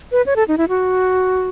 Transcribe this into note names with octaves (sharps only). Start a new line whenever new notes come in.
B4
C#5
A4
D#4
E4
F#4